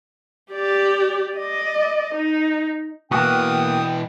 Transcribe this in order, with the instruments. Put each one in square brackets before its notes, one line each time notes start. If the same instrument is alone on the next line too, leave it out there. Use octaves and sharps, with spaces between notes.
[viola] G4 D5
D5 D#5
D#4
[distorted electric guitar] B2 E3 [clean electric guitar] A#3 B3 F#4 [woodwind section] G5 [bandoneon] D#6